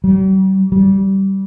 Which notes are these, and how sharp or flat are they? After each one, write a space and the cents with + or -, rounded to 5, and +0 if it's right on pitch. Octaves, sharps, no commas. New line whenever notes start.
G3 -45
G3 -20